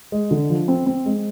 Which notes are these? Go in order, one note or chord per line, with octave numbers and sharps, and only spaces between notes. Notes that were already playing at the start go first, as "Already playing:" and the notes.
G#3
D3
F3
C4
C4
G#3